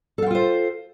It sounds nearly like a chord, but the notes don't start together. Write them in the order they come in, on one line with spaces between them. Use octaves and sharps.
A4 F5 G5 F4 C5